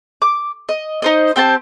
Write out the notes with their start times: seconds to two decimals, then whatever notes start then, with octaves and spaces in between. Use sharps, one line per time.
0.22 D6
0.69 D#5
1.02 D#4 C5 D#5
1.36 C4 G4 C5 A5